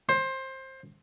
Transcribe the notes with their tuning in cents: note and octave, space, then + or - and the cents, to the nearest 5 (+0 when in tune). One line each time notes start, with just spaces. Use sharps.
C5 +20